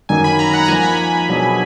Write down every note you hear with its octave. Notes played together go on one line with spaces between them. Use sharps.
F#2 D#3 F#3 A#3 D#4 G#5
B5
A#5
F#5
A#5
F3 A#3 D#4 G#5
B5
B2 F#3 D4 G#4